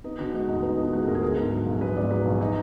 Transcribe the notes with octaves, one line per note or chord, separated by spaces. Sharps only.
B3 D#4
D3 F#4
G#3 F#4
D2 D#4
B3 D#4
D3 F4
G#3 F#4
G#4
D2 A#4
G#4
B3 A#4
G#2
F#3
A#1
B3 B4
G#2 D5
F#3 B4
A#1
F#3 D#4